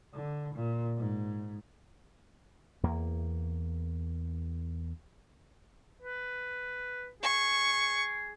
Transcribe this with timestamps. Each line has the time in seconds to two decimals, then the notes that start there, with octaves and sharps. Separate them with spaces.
0.14 D3
0.54 A#2
0.98 G#2
2.83 E2 A#3
6.02 B4
7.23 G#4 C#6